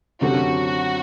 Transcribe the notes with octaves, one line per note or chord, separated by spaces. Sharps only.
F#2 D3 A3 C4 F#4 G4